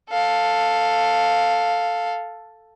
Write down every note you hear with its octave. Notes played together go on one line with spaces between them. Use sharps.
A4 F5